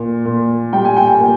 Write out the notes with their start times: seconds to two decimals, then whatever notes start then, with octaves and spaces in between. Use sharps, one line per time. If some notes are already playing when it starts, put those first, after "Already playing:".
Already playing: A#2
0.25 A#2
0.73 G3 G5
0.85 G#5
0.97 G5
1.10 G#5
1.20 A#2